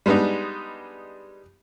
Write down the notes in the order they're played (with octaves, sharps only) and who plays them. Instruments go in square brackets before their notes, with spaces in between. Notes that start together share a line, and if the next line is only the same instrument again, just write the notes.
[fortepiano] G3 G#3 B3 D4 D#4